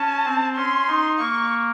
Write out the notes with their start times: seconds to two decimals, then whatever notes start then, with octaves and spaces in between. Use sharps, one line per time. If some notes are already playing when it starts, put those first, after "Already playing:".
Already playing: C#4 A5
0.25 C4
0.56 C#4 C6
0.87 D#4
1.19 A#3 C#6